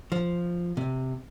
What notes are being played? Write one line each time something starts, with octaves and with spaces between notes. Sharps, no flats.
F3
C3